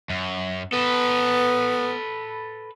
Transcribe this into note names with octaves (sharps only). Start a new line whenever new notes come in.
F#2
B3 A4 B4